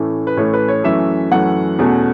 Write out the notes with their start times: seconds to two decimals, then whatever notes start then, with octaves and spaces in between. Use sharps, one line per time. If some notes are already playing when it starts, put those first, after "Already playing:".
Already playing: A2 E3 A3 C#4
0.27 B4
0.37 A2 E3 A3 C#4 C#5
0.53 B4
0.68 C#5
0.84 F#2 E3 A3 C#4 E5
1.31 F#2 E3 A3 C#4 F#5
1.79 E2 B2 A3 C#4